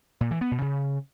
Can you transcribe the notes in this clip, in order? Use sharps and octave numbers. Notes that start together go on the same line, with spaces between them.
A#2
E3
B3
B2
C#3